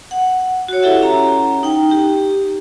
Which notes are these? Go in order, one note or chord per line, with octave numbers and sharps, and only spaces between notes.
F#5
F#4 C#5
E4 G4 A4 E5 F#5
C#4 A#5
D#4 G5
G4